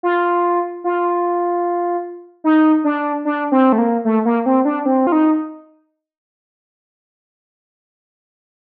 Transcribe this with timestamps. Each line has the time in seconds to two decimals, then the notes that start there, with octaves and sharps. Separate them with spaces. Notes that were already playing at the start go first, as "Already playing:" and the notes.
0.03 F4
0.84 F4
2.44 D#4
2.84 D4
3.25 D4
3.52 C4
3.72 A3
3.78 A#3
4.05 A3
4.25 A#3
4.46 C4
4.65 D4
4.86 C4
5.07 F4
5.12 D#4